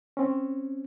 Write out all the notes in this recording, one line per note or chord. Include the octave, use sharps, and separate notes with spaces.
C4 C#4